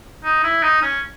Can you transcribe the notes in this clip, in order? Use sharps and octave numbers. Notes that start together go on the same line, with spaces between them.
D#4
E4
D#4
C#4